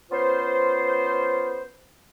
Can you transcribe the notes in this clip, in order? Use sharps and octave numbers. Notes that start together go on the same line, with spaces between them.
B3 C#4 F4 C5